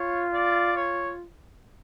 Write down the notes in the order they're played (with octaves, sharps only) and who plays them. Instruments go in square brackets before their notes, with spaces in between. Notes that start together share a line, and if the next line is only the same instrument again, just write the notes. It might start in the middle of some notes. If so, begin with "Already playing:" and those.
Already playing: [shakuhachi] F4 [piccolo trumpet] C#5
[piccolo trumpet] D5
C#5